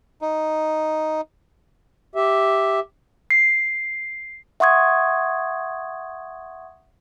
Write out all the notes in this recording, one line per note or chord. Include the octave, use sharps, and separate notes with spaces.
D#4
G4 E5
C7
E5 F#5 C6 C#6 D#6 G#6